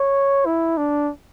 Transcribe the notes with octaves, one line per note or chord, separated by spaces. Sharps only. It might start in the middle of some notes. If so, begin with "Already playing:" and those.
Already playing: C#5
E4
D4